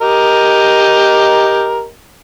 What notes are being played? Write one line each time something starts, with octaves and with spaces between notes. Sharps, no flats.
G4 A#4 D#5